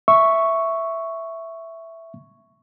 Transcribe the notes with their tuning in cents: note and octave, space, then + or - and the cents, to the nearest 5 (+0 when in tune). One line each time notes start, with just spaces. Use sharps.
E5 +0 C#6 +0